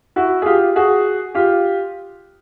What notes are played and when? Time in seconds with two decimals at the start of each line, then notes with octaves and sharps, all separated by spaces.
0.16 E4 F#4
0.42 G#4
0.46 F4 G4
0.76 F#4 G#4
1.35 F4 G4